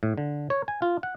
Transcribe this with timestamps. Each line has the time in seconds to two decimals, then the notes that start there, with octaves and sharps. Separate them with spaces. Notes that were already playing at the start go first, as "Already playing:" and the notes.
0.03 A2
0.18 D3
0.50 C#5
0.68 G#5
0.82 F4
1.03 F#5